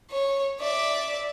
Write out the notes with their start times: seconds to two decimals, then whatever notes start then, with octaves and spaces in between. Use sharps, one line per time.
0.10 C#5
0.60 D5 E5